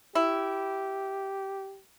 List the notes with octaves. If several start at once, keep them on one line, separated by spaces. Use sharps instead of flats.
E4 G4